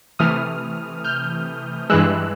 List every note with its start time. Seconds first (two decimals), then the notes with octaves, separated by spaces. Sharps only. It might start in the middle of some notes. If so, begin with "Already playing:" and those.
0.19 C3 E3 A3 D#6 F6
1.04 F6 G6
1.90 G2 E3 G#3 E6 F#6